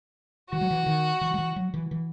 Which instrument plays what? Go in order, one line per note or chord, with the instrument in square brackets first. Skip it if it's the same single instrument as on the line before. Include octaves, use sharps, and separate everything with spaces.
[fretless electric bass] E3 [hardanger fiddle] F#4
[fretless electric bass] F#3
E3
D#3
E3
F#3
E3
F#3
E3
E3